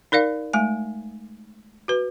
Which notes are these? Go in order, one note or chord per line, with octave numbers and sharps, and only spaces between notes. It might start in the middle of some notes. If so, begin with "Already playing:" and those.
D#4 A#4 D5 F5
G#3 A3 G#5
F#4 B4